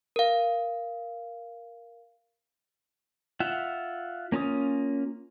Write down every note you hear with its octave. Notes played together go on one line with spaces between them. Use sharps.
A#4 F5
F4 E5 F#5
A#3 C#4 F4 D#6